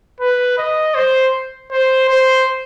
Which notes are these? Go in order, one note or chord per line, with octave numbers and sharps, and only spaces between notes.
B4
D#5
C5
C5
C5